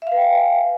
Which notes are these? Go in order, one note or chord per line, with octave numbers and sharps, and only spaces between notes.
B4 E5 F5 G5 G#5